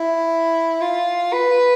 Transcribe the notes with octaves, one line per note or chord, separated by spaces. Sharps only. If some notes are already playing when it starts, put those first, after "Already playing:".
Already playing: E4
F4
B4